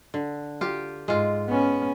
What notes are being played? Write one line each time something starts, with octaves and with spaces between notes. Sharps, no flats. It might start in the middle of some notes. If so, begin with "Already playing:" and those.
D3
F4 G4
G#2 G#3 F4
B3 C#4